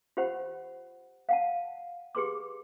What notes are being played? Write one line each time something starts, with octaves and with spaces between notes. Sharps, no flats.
F4 G4 C5 F#5 B5
F5 F#5 A5
G4 G#4 B4 C6 D6